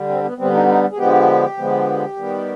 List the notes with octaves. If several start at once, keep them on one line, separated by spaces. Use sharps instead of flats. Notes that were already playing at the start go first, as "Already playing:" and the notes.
Already playing: D3 G3
C4
B3
D3 G3 B3 C4
D#4
D#4
G#4
D3 F3 G#3 B3 G4
D3 F3 G#3 B3
D#3 G3 B3